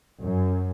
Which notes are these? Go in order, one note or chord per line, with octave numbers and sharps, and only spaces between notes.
F#2